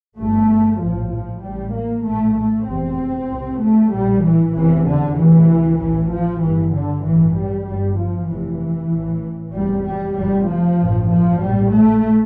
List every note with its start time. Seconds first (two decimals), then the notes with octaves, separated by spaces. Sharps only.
0.17 G1 G2 A3
0.80 A#1 A2 F3
1.11 F3
1.42 A1 A2 G3
1.74 A#3
2.05 A#1 A2 A3
2.36 A3
2.67 F1 E2 C3 C4
3.30 C2 C3
3.61 A3
3.92 A#1 A2 G3
4.24 E3
4.55 F1 E2 C3 E3
4.86 D3
5.17 D2 C3 E3
5.80 A1 A2 E3
6.11 F3
6.42 G1 G2 E3
6.73 D3
7.05 A1 G2 E3
7.36 G3
7.68 G1 G2 G3
7.99 F3
8.30 F1 F2 C3 E3
8.93 A1 A2
9.55 F1 E2 C3 G3
9.86 G3
10.18 F1 F2 C3 G3
10.48 F3
10.80 A1 G2
11.11 F3
11.43 A#1 A2 G3
11.74 A3